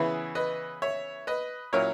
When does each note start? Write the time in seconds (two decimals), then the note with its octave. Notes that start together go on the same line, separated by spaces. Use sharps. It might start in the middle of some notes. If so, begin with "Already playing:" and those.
Already playing: C#3 E3 B3 E4 G#4 B4
0.35 B4 D#5
0.82 C#5 E5
1.27 B4 D#5
1.73 A#2 F#3 C#4 E4 A#4 C#5